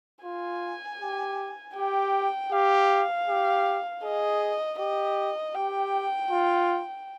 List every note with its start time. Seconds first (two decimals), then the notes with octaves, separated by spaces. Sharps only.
0.24 F4 G#5
1.00 G4
1.76 G4 G5
2.52 G4 F5
3.27 G4
4.03 G#4 D#5
4.79 G4 D#5
5.54 G4 G5
6.31 F4